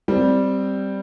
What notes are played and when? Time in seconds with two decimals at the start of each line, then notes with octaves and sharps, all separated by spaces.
0.08 G3 C4